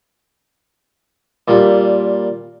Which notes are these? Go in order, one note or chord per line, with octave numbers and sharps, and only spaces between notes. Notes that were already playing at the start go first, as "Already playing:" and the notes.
A#2 G3